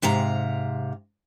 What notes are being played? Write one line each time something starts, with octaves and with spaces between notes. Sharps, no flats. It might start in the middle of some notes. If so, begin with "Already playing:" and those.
G#2 C3 F5 A#5